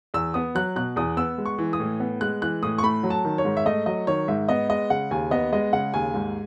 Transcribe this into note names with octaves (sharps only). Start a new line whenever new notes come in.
E2 E6
B3 D#6
F#3 F#6
B2 F#6
E2 D#6
B3 E6
G#3
C#6
E3
D#6
A2
B3
G#3 F#6
E3 F#6
A2 D#6
C#6
A3 B5
F#3
A5
D#3
C#5
G#2
E5
A3 D#5
F#3 D#5
D#3 C#5
G#2 E5
B3 D#5
G#3 D#5
C#3 F#5
D#2 G#5
B3 D#5
G#3 D#5
C#3 F#5
D#2 G#5
G#2